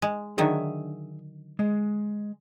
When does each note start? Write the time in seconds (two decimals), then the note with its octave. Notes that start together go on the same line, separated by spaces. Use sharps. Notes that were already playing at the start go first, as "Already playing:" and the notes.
0.02 G#3
0.38 D3 D#3 F#3 G#4 E5
1.59 G#3